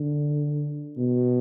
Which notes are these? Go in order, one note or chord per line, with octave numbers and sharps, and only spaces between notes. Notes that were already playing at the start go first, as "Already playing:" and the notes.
Already playing: D3
B2